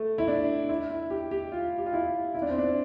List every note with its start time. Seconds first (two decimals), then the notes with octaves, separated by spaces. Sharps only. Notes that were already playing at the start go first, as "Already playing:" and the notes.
Already playing: A3
0.18 E4
0.28 D4
0.69 E4
0.90 E4
1.10 G4
1.31 G4
1.52 F4
1.78 G4
1.86 F4
1.93 E4
2.35 E4
2.42 D4
2.50 C4
2.58 D4